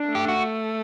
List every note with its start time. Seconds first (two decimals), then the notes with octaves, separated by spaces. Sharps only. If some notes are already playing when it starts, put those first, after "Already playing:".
Already playing: D4
0.08 A3
0.15 G4
0.28 F#4